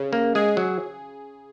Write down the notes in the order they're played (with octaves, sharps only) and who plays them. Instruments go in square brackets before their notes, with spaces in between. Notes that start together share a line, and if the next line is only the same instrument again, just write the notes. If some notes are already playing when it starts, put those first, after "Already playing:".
Already playing: [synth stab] C#3
[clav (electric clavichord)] A#3
[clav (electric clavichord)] G#3 [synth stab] G#4
[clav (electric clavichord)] F#3